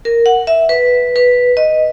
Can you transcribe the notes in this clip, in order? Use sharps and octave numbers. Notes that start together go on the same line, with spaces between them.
A#4
F#5
E5
B4
B4
D#5